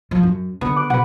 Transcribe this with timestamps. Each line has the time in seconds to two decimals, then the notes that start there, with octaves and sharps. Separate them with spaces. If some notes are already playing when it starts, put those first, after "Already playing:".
0.11 F3
0.23 F#2
0.61 D3 B3
0.76 D6 F#6
0.90 B2 B4 F#5